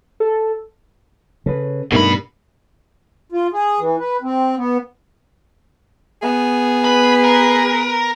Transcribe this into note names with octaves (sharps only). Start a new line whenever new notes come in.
A4
C#3 A4 B4
G2 B2 G#3 A3 D#4 A#4 B5
F4
G#4
E3
B4
C4
B3
B3 G#4
B4 B5
A#4